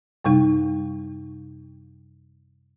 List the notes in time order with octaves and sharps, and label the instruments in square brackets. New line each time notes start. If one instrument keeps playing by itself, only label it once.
[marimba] F#2 C3 G3 D#4